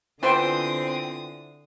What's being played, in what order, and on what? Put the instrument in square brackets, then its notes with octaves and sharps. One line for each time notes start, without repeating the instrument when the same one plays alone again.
[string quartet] D3 D#6 [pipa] E3 B3 C5 [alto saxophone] C4 [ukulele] F4 G5